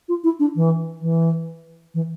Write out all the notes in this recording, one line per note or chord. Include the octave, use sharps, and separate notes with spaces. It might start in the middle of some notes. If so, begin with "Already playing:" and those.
F4
E4
D4
E3
E3
E3